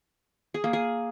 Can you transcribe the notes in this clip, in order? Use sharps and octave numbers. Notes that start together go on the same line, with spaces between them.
G#4
A#3
G#4